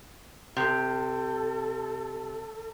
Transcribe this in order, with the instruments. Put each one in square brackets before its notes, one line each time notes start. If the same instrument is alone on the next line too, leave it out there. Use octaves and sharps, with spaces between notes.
[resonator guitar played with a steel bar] C3 [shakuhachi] A4